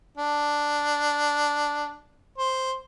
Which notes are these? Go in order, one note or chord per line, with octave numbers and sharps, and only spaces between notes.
D4
C5